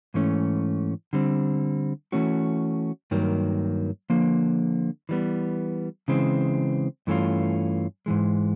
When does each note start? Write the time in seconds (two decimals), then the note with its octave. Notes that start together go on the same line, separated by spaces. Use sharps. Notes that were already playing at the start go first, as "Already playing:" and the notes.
0.14 G#2 E3 A3 C#4
1.13 D3 G3 C4
2.12 E3 A3 C#4 F#4
3.11 G2 D#3 F#3 A#3
4.10 D3 F3 A#3
5.09 E3 G3 B3
6.08 C#3 E3 G#3 C4
7.07 G2 E3 A3 C#4 F4
8.06 G#2 E3 G#3